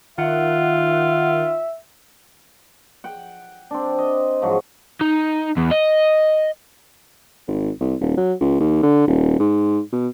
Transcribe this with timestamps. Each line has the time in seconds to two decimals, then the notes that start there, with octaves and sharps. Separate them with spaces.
0.18 D#3 F4 E5 F#5
3.04 F#5 G5
3.71 C4 D4
3.98 D#5
4.42 G#2 F3 F#3 F#4
5.01 D#4
5.57 E2
5.71 D#5
7.48 G#1
7.80 C2
8.01 D#1
8.17 F#3
8.40 C#2
8.60 D#2
8.83 D3
9.07 D#1
9.40 G#2
9.93 B2